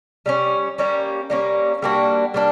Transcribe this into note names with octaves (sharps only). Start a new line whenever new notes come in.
G3 A#3 C#4
G3 A#3 C#4
G3 A#3 C#4
G3 A#3 D4 F#4
G3 A#3 D4